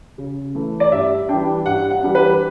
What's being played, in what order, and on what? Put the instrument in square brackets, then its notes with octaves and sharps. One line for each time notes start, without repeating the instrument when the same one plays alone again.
[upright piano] C#3
E3 A3
D5
G2 E5
E3 G3 D4 G5
G2 F#5
F#5
E3 G3 D4
B4